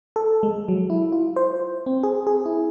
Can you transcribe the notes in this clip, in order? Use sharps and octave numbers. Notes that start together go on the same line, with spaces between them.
A4
G#3
F#3
E4
F4
C5
C4
G#4
G#4
E4